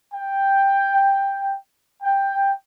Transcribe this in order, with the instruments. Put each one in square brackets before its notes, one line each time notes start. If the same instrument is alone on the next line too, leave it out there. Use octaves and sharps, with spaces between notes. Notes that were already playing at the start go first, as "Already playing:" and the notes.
[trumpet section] G5
G5